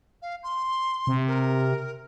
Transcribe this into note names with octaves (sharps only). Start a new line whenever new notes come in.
F5
C6
C3
A#4